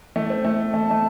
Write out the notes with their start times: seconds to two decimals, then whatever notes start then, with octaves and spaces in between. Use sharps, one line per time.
0.16 A3
0.30 C4
0.45 A3
0.73 A3 A5
0.91 A3